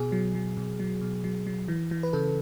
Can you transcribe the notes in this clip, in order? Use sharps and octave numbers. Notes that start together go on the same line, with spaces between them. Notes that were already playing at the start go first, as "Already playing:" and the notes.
Already playing: B2 G#4
F#3
F#3
B2
F#3
B2
F#3
F#3
E3
E3
B4
C#3 A4